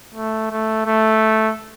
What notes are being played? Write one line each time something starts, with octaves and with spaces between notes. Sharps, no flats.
A3
A3
A3